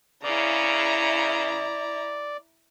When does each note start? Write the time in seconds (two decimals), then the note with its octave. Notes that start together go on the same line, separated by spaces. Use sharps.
0.24 E2 C#3 E4 D5 A#5